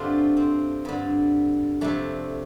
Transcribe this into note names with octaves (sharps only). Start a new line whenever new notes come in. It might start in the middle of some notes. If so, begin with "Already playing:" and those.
Already playing: G2 D3 A3 C4 D4 F4 G4
C4
G2 D3
F2 C3 A3 D4